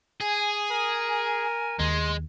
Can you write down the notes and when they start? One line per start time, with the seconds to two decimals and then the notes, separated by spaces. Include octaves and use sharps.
0.21 G#4 G#5
0.71 A#4
1.79 D#2 G#3 C6